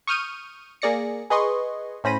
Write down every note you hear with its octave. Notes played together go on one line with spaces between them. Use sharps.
C#6 D#6 F6 G6 D#7
A#3 G#4 D5 A#6 C#7
G#4 B4 D#5 C6 C#6
A2 C#4 C5 B5 A#6 D#7